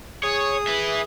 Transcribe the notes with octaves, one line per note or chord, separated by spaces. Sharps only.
G#4 C#5 D#6
B4 E5